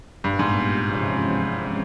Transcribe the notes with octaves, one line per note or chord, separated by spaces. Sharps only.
G2 A#2 G3 B3
G#2
E2 C3 F3 G#3 C#4